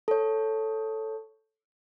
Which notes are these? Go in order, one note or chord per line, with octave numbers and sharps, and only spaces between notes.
A4 C#5